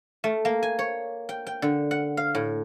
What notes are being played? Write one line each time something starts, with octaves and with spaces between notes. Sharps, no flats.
A3
A#3
G#5
C#5
G5
G5
D3
F#5
F5
A2